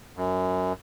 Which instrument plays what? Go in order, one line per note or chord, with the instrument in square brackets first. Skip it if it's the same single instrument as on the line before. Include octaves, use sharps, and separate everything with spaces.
[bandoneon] F#2